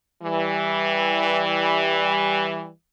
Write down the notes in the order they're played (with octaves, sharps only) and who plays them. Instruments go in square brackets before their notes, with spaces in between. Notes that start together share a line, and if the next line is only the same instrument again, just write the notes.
[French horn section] E3 G3